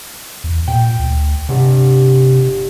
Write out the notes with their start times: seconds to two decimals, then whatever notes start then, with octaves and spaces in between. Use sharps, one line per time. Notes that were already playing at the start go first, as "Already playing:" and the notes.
0.44 E2
0.68 A#2 G5
0.99 D2
1.49 G1 C3